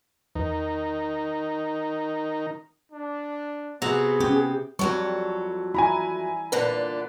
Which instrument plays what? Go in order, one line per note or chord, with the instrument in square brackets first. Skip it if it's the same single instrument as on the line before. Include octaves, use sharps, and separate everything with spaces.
[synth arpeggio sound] E2 [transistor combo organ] D#3 D#4
[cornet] D4
[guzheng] C3 F#4 A#5 [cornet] B3 [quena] G#4
[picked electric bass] C4 C#4 [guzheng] G4
[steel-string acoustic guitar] F2 F#3 A4 [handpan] G3 [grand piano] C#6
[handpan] E4 [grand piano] G#5 A#5 B5
[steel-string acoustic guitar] A#2 D3 D4 [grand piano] B4